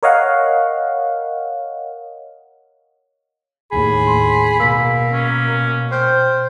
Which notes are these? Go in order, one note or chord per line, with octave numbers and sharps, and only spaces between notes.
A#4 C#5 D#5 F5 F#5
D#2 A2 G#4 B5
C6
B2 A#3 E6 B6
C#4
C5 G5 F6 G6